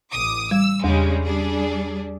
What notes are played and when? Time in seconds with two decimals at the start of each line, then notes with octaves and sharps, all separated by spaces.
0.12 A1 D6 D#6
0.51 G3 E6
0.84 E2 C#3 G3 G#3
1.25 G3 D4 G#4